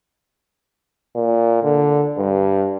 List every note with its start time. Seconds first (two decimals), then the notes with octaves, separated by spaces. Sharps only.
1.16 A#2
1.64 D3
2.18 G2